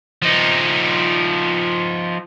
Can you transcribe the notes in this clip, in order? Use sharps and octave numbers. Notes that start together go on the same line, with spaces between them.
F3 D#4